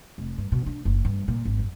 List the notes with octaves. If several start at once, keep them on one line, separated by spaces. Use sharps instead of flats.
F1
G2
B2
D4
F#1
G2
A#2
G#1
F#2